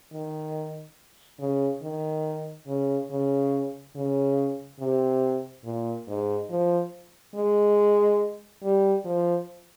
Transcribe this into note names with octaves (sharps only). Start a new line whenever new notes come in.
D#3
C#3
D#3
C#3
C#3
C#3
C3
A#2
G#2
F3
G#3
G3
F3